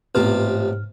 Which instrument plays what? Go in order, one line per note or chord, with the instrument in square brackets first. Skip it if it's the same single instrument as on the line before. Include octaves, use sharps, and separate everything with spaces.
[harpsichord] A1 C3 F4 [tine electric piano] G#2 F6 [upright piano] B3